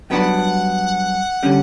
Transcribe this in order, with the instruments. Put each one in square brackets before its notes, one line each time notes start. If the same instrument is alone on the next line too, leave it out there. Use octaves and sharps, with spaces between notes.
[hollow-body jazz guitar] G2 F#3 B3 D4 [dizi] F#5 G5
[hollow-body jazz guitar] D3 G3 C#4